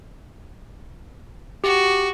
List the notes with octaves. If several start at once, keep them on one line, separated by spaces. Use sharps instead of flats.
F#4 G4